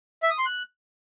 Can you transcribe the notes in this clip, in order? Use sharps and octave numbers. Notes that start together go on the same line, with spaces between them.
E5
D#6
C6
F#6